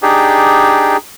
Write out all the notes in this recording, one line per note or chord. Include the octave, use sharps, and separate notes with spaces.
D4 D#4 G4 G#4